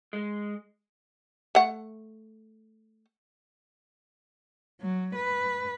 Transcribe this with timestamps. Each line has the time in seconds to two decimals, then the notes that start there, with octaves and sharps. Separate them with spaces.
0.13 G#3
1.55 A3 F#5
4.82 F#3
5.15 B4